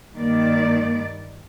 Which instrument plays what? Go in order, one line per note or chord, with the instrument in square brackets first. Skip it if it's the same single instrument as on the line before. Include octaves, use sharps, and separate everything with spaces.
[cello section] G2 D#3 D5 [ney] A#3